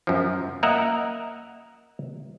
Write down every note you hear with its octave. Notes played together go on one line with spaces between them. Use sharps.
F#2 F3
A#3 A#4 D#5 E5 F#5 A#5